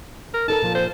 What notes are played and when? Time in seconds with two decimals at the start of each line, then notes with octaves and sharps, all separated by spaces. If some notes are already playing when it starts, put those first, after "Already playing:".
0.34 A#4
0.48 D#4 A4 A#4 A5
0.62 A#2 F3
0.75 C5